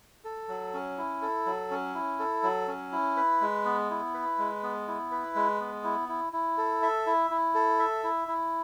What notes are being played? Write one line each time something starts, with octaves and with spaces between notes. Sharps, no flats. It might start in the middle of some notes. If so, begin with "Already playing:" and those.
A4
F#3
C#4
E4
A4
F#3
C#4
E4
A4
F#3
C#4
E4
B4
G#3
B3
E4
B4
G#3
B3
E4
B4
G#3
B3
E4
E4
E4
A4
E5
E4
E4
A4
E5
E4
E4